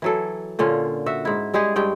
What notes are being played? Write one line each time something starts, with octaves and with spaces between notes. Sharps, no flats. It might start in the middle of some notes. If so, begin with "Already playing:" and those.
E3 F#3 A4
A#2 D3 C#4 F4
F#4 E5
G#2 E4
G3 G#3 G4 G#4
G2 G#3 G5